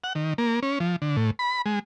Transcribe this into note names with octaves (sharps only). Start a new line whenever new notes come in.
F#5
D#3
A#3
C#4
F3
D3
A2
B5
G#3